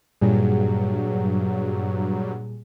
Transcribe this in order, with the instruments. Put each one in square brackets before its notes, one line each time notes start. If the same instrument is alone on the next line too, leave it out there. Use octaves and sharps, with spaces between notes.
[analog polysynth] G2 F#3 [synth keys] A#2 G3 G#4